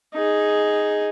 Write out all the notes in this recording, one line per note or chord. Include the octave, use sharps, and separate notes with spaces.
D#4 G#4